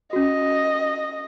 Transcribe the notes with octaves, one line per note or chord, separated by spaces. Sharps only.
C#4 F#4 D#5